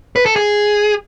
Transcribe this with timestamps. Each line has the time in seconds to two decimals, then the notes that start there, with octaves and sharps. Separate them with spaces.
0.16 B4
0.26 A4
0.36 G#4